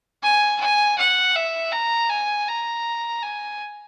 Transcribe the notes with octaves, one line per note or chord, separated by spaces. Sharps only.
G#5
G#5
F#5
E5
A#5
G#5
A#5
G#5